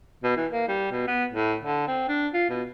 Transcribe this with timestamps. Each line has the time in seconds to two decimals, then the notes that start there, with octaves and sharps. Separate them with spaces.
0.23 B2
0.36 E3
0.52 A#3
0.68 G3
0.91 B2
1.07 B3
1.33 A2
1.62 D3
1.88 C4
2.08 D4
2.33 F4
2.49 B2